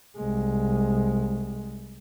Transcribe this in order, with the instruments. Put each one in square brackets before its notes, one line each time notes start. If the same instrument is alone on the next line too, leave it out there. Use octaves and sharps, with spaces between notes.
[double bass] C2 G#3